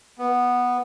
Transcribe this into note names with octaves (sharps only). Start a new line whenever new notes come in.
B3